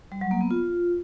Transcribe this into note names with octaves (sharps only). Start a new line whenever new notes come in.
G3
F#3
A#3
B3
F4